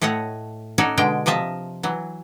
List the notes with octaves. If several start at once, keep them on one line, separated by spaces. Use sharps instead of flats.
A2 A3 C#5 D#5 F#5
C#4 D#4 F#4 A4 C#5 D5
B2 D3 G#3 G5
C3 F3 D#5 E5 A5
E3 F#3